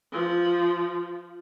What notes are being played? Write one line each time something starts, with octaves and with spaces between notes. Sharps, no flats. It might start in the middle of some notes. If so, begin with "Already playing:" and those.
F3